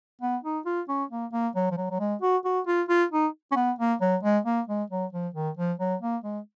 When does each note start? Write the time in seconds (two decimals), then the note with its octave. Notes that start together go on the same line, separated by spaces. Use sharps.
0.21 B3
0.43 D#4
0.65 F4
0.88 C#4
1.10 A#3
1.33 A#3
1.55 F#3
1.71 F3
1.77 F#3
1.91 F#3
1.99 G#3
2.22 F#4
2.45 F#4
2.67 F4
2.89 F4
3.11 D#4
3.51 C#4
3.56 B3
3.78 A#3
4.01 F#3
4.23 G#3
4.45 A#3
4.68 G#3
4.90 F#3
5.13 F3
5.34 D#3
5.57 F3
5.80 F#3
6.01 A#3
6.24 G#3